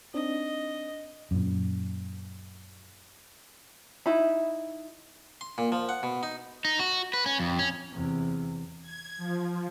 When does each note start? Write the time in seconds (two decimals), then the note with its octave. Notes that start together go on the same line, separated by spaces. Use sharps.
0.14 C4 D4 D#4 D#5
1.31 F#2 A#2
4.06 D#4 E4 B5
5.41 C6
5.58 A#2
5.72 F3
5.89 F#5
6.03 B2
6.23 D#4
6.65 D#4
6.80 F#4
7.14 B4
7.26 C#4
7.40 F2
7.59 C#4
7.93 E2 C3
8.82 G#6
9.17 F3